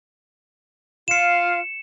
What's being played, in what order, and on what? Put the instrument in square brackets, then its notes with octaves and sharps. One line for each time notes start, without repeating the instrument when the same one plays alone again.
[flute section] F4 F5 [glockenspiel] C#7 E7